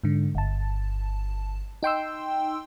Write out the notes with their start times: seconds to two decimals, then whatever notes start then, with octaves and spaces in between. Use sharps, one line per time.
0.04 G#2 D3
0.35 G1 A5
1.83 D#4 G5 C6 E6